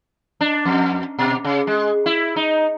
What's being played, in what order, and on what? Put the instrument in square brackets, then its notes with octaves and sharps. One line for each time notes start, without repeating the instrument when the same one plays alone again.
[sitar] D4
F2
B2
C#3
G#3
E4
D#4